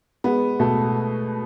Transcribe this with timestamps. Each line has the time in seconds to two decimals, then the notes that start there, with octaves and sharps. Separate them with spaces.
0.24 G#3 B3
0.59 B2 A3